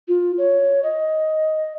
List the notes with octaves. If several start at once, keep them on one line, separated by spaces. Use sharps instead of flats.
F4
C#5
D#5